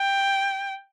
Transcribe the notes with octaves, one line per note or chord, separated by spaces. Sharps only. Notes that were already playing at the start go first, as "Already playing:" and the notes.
Already playing: G5